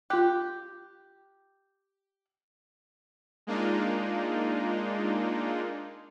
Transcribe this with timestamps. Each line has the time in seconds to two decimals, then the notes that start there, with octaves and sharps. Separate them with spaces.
0.10 F4 G4 F#6
3.47 G#3 A#3 D4 D#4 F4